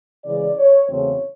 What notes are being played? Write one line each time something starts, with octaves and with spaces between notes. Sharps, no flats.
C#3 E3 G#3 D5
C#5
E2 C#3 F#3 A3 C4 C#5